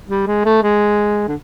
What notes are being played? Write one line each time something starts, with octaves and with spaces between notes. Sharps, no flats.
G3
G#3
A3
G#3
D3